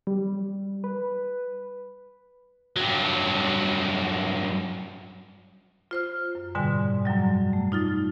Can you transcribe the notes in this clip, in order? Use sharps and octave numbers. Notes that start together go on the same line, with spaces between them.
G3
B4
G2 F#3
F4 C5 F6
F#2
G#2 B2 D3 G3 G#5
F#2 D3 F#3 G3
A3
D#4 F4 A6